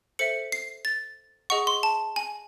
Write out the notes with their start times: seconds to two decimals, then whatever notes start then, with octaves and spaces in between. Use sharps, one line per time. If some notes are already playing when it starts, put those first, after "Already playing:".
0.19 A4 C5 E5 C#7
0.52 C7
0.85 A6
1.50 G#4 D#5 F#5 C#6
1.67 C6
1.83 A5
2.16 G#5